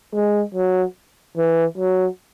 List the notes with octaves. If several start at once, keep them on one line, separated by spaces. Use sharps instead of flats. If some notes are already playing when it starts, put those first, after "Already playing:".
G#3
F#3
E3
F#3